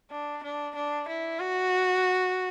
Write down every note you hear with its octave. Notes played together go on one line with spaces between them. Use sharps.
D4
D4
D4
E4
F#4